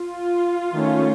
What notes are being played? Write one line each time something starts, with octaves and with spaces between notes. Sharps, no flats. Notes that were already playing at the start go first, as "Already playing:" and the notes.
Already playing: F4
D#3 A3 C#4